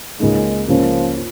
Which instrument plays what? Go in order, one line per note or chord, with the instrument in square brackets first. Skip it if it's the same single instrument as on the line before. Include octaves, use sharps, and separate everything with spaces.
[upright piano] C#2 C#3 A#3 D#4 [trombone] G#3
[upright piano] C#2 C#3 A#3 C#4 [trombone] F3
[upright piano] F4